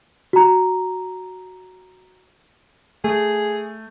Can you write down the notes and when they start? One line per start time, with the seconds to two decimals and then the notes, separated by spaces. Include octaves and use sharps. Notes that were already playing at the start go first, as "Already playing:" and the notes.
0.33 F#4 A#5
3.04 A3 G#4